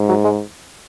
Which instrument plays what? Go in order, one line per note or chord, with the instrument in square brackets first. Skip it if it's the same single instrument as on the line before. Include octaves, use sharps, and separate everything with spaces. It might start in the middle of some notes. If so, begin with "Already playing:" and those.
Already playing: [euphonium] G#2
[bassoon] F#3
G#3